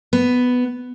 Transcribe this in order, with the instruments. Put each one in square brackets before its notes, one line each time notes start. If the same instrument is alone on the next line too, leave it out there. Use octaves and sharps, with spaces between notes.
[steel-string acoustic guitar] B3